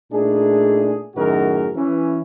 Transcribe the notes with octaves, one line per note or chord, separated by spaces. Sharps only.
A#2 A3 D4 D#4 G#4
F#2 A2 D#3 F#4 G#4 A#4
E3 C#4